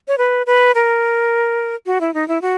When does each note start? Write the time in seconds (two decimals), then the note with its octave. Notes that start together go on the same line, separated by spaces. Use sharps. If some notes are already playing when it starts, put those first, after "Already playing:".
0.08 C#5
0.18 B4
0.46 B4
0.75 A#4
1.86 F#4
2.01 E4
2.14 D#4
2.28 E4
2.42 F#4